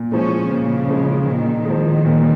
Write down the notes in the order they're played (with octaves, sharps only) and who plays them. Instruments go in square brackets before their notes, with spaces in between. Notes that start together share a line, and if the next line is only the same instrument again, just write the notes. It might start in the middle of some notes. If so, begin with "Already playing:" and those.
Already playing: [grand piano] A#2
[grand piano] F3 G#3 [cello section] C#4
[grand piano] A#2 [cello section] C#3
[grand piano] F3 G#3
[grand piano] A#2 [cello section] D#3
[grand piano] F3 G#3
A#2